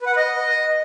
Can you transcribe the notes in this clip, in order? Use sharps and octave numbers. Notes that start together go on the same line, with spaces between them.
B4
F#5
B4
D#5